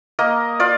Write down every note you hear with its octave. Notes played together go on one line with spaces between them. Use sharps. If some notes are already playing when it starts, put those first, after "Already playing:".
A#3 D#5
F4 D5